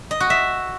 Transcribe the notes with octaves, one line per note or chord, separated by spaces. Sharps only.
D#5
F#4
E5